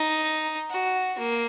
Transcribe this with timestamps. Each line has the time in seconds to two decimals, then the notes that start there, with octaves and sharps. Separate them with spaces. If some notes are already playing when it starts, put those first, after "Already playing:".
Already playing: D#4
0.70 F#4
1.18 A#3